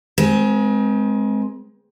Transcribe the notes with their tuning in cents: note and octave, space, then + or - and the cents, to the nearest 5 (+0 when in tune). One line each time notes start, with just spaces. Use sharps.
G#3 +20 C4 +0 B4 -45